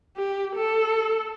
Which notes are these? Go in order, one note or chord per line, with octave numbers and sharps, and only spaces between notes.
G4
A4